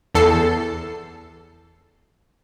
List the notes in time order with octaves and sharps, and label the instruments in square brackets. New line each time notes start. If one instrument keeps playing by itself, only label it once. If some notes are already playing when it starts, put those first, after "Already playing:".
[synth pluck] E2 A4 C7